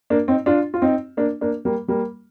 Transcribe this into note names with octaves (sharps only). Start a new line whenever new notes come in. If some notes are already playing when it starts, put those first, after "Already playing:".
A#3 D4
C4 D#4
D4 F4
F4
C4 D#4
A#3 D4
A#3 D4
G3 A#3
G3 A#3